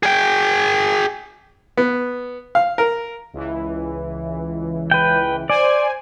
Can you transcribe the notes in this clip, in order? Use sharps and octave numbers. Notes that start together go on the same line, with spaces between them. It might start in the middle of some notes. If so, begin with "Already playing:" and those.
G#4 G5
B3
F5
A#4
C#2 E3
B4 G5
C5 D5 G#5